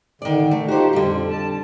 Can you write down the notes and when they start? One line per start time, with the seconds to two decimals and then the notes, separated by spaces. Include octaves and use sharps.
0.22 D3 D#3 D5
0.51 A3
0.68 F3 D#4 F#4 G4 C5
0.93 F2 D3 G3
1.29 A5